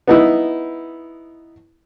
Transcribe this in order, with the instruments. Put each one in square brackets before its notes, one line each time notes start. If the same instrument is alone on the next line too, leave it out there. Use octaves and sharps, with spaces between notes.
[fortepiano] B3 D#4 E4